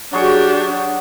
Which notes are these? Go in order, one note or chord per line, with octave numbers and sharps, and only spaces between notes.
F#3 D4 G4 G#4 C#6